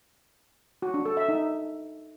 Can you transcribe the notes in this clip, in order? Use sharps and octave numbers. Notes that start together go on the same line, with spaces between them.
F#4
D4
A4
E5
D#4